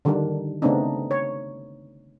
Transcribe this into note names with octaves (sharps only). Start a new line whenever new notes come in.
D3 D#3 G3 D4 A#4
C#3 A3 B3 C4 D4 D#4
C#5